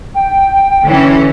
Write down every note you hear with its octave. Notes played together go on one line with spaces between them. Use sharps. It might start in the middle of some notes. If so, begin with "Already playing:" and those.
G5
D3 E3 C#4